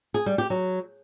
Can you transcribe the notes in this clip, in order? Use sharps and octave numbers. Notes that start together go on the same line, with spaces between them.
G#4
G3
G4
F#3